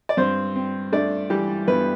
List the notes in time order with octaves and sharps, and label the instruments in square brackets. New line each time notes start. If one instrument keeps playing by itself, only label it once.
[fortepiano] D5
G2 C4 C5
C4
A3 D4 D5
E3 G3 G4
G2 B3 B4